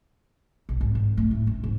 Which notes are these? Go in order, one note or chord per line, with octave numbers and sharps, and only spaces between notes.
B1
G#1
G#1
A3
A2
C#4
G#2